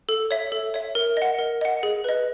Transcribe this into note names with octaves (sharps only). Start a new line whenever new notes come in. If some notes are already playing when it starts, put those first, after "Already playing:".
A4
C#5 E5
A4
C#5 E5
A#4
D#5 F#5
A#4
D#5 F#5
G#4
B4 D#5